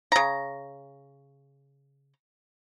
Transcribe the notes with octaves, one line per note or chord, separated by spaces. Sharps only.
C#3 A#5